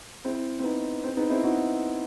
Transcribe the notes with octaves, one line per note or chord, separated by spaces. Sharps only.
C4 E4
C4
B3 D#4
C4
B3 D#4
C4 E4
D#4 F#4